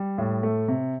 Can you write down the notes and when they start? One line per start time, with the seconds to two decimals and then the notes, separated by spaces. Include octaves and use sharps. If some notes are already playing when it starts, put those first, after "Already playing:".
Already playing: G3
0.18 A2
0.43 A3
0.68 C3